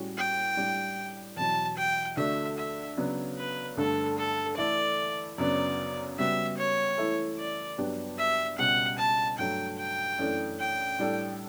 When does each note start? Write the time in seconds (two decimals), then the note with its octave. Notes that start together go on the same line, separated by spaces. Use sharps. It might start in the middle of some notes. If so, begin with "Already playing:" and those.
Already playing: A2 G3 C#4 F#4
0.17 G5
0.57 A2 G3 D4 G4
1.37 E2 B2 F#3 A5
1.77 G5
2.17 D2 D3 A3 D4 F#4 E5
2.58 E5
2.97 C#3 F#3 B3 D4
3.37 B4
3.77 G2 D3 A3 A4
4.18 A4
4.57 E3 A3 E4 A4 D5
5.38 F#2 C#3 F#3 B3 D4 D5
6.18 C#3 G3 B3 F#4 E5
6.57 C#5
6.98 E3 A3 E4 A4
7.38 D5
7.78 G2 F#3 B3 D4 G4
8.18 E5
8.59 C#2 B2 G3 C#4 F#5
8.99 A5
9.38 G2 F#3 A3 G5
9.78 G5
10.19 F#2 E3 A3 D4 A4
10.59 G5
10.99 A2 G3 D4 A4